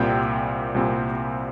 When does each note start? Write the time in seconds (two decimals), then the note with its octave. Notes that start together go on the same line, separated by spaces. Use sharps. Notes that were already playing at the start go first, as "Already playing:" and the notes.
Already playing: C2 A#2 G3 C4 G5
0.74 C2 A#2 G3 C4